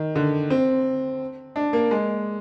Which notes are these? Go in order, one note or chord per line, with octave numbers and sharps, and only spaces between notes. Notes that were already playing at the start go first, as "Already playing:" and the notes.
Already playing: D#3
D3
C4
D4
A#3
G#3